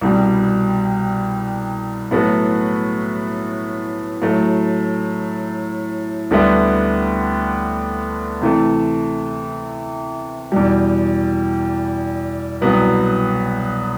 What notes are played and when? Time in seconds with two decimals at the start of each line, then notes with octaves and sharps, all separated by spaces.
0.01 C2 B2 G3
2.11 A2 F#3 B3 F#4 A4
4.22 A2 F#3 A3
6.31 D2 D3 G3 B3 E4
8.41 C3 E3 A3
10.52 E2 B2 G3
12.61 C2 B2 F#3 B3